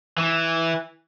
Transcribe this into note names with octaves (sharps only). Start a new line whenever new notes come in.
E3